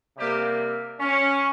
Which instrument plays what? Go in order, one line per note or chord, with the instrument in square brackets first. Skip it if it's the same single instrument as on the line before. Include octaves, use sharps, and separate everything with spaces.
[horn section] C3 G3 A#3 G4
C#4